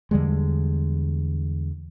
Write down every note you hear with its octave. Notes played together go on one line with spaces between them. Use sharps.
E2 D3 G3 G#3